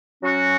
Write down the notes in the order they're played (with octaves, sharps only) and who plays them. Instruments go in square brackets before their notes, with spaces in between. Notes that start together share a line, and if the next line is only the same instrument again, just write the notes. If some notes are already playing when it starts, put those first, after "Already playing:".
[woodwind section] F#3 C#4 F#4